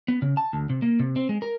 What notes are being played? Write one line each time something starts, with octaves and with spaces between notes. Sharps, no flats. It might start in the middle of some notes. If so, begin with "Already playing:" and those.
B3
C#3
A5
D2
C3
A#3
C3
C4
G#3
A#4